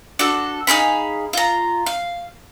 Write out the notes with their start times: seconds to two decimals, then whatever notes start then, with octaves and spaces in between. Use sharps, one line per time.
0.19 D4 F#4 A4
0.67 D#4 G#4 F5 B5
1.33 F4 A#5
1.86 F5